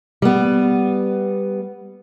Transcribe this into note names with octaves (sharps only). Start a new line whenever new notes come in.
G3 B3